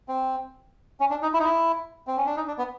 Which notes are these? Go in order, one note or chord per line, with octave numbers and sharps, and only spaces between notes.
C4
C#4
D4
D#4
E4
D#4
E4
C4
C#4
D4
D#4
D4
B3